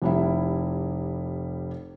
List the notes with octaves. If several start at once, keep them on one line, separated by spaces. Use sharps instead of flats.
F1 G3 E4